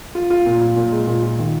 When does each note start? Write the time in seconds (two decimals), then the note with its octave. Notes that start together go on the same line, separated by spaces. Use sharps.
0.15 F4
0.30 F4
0.46 A#2
0.61 F4
0.76 A#2
0.92 G#3
1.07 A#2
1.23 F4
1.39 D#3